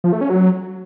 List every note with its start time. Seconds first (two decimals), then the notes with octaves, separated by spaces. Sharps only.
0.04 F3
0.13 A3
0.21 C#4
0.30 F#3